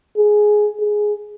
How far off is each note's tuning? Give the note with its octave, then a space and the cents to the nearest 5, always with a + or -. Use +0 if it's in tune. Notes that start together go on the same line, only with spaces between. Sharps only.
G#4 +10
G#4 +5